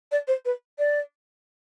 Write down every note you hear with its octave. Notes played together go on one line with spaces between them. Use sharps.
D5
C5
B4
D5